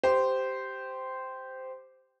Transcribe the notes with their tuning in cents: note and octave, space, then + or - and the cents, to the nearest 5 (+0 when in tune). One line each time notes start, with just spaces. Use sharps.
G4 -5 C5 -10